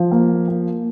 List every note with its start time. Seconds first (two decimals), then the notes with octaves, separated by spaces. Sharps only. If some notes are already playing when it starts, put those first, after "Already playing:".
Already playing: F3
0.12 A#3
0.48 A#3